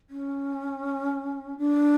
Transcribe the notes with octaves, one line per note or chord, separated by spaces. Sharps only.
C#4
D4